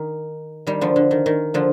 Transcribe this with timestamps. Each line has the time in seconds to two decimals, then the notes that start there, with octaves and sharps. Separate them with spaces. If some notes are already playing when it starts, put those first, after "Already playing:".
Already playing: D#3
0.67 D#3 G3
0.81 D3 F3
0.96 D3
1.11 D#3
1.26 D#3
1.54 D3 F3